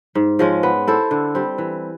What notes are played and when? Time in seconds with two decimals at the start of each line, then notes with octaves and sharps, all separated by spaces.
0.15 G#2
0.39 F3 G#3 C#4
0.63 B3
0.87 E4 A4 C5
1.11 D3
1.35 G3 C4
1.58 E3